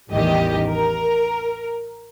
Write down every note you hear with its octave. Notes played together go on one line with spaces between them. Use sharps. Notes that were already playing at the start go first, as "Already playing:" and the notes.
A1 E2 D#3 G3 G4 D#5
A#4